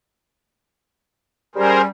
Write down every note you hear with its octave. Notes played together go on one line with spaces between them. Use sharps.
G3 C#4 G#4 A#4 C5